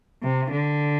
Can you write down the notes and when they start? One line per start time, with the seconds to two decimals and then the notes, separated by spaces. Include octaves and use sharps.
0.23 C3
0.51 D3